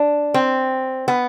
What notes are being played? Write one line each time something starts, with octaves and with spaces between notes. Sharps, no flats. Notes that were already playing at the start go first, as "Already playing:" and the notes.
Already playing: D4
C4
B3